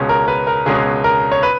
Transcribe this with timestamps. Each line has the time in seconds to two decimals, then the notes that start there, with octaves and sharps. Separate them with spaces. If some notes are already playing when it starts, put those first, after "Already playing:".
Already playing: C#2 B2 G#3 C#4
0.09 A#4
0.28 B4
0.47 A#4
0.66 C#2 B2 G#3 C#4 G#4
1.04 A#4
1.32 C#5
1.43 B4